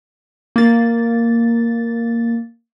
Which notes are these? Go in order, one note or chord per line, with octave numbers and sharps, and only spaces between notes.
A#3 A6